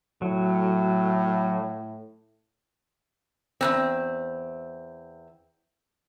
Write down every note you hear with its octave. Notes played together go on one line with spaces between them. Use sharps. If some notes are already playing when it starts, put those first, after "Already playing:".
A2 F#3
E2 G2 C4